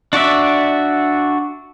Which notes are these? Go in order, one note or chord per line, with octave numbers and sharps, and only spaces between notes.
D4 F#4 D5 E5